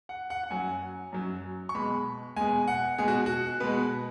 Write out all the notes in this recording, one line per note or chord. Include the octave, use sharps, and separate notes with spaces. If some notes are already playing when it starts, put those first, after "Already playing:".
F#5
F#5
F#5
F#2 F#3 G#5
F#2 F#3
C#6
B2 G#3 B5
B2 G#3 G#5
F#5
B2 G#3 G#4
F#4
F#4
B2 G#3 B4